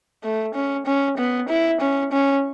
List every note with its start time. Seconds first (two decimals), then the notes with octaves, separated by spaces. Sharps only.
0.24 A3
0.54 C#4
0.86 C#4
1.18 B3
1.49 E4
1.81 C#4
2.12 C#4